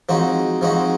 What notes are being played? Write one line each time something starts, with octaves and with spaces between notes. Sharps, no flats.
F3 G#3 C4 D#4 F#4
F3 G#3 C4 D#4 F#4